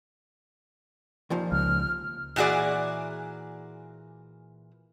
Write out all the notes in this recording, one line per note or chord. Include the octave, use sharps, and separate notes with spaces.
D#2 A#2 F3
C#2 F6
A#2 E3 F#4 G#4 D5